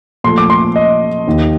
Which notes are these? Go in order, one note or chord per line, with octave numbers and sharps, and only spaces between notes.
A#2 F3 A3 C6
D6
C6
D#5
D#2 D#3 A#3